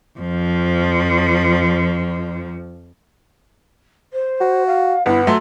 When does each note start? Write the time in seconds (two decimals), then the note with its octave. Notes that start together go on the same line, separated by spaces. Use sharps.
0.19 F2 F3
4.13 C5
4.41 F#4
4.66 F5
5.06 G1 B3 E4
5.27 F#3 A3 C6